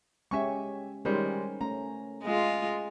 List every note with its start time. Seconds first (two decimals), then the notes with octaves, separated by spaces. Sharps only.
0.31 G#3 C#4 G4 E5 G#5 C#6
1.05 D#3 G3 G#3 C#4 A#4 C5
1.61 A3 C#4 A#5
2.23 G#3 F4